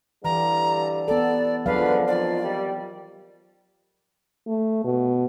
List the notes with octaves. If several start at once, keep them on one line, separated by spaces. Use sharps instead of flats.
G2 D3 E3 G3 A#5
B3 A4 D5
C#2 D3 F3 F#3 B4 F5
F2 D#3 F4 D5
D#3 G3
A3
B2